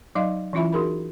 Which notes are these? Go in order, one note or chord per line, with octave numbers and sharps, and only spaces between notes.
F#3 D#4 D#5 F5
E3 C#4 E4 F4 E5 B5
D#4 F#4 G#4 A#4 B5